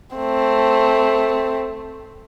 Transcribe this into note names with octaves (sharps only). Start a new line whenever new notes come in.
A3 C4